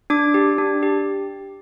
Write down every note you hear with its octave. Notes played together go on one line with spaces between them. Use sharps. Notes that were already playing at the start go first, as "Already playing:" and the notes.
D4 D6
G4
D4
G4